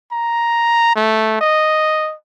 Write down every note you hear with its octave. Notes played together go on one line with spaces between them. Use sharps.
A#5
A3
D#5